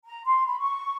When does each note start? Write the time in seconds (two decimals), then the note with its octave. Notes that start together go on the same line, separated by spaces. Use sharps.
0.04 A#5
0.25 C6
0.46 B5
0.59 C#6